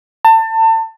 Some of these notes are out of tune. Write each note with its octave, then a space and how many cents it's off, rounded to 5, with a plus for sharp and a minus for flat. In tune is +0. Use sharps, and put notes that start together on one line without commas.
A5 +30